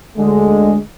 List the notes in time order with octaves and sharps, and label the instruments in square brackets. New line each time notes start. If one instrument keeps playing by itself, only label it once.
[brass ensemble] D2 D3 G#3